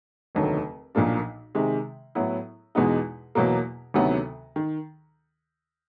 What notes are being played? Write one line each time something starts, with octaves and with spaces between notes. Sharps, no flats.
F1 D#2 D3 F#3 A3
B1 A#2 F3 A#3 D4
C3 D#3 G#3
A2 F#3 B3 E4
E2 B2 G#3 B3 D#4
E2 B2 F#3 A#3
D2 C3 D#3 F#3 B3
D#3